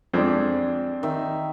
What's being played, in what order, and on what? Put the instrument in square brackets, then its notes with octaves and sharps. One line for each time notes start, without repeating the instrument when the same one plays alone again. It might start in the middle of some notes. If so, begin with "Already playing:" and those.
[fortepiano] F2 F3 G#3 [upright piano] C4 D4
[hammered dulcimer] D#3 E5